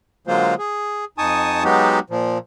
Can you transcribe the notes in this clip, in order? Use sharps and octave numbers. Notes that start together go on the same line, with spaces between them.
D3 F#3 G#3 A#3 F4 C5
G#4
F2 D#4 G#5 A5 C#6 D#6
F#3 G#3 B3 D#4 F#4 G4
A#2 F3